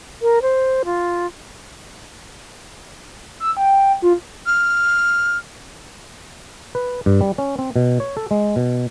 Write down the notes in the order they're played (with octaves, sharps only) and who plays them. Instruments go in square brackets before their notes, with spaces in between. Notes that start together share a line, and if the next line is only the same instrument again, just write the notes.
[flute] A#4
C5
F4
[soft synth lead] E6
G5
F4
[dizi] F6
[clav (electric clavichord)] B4
G2
G3
C#4
C4
B2
C#5
A4
G#3
B2